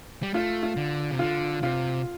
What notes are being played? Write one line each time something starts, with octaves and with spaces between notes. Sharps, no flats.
G3
A3 F4
F4
D3
C3
D3 F4
C3 F4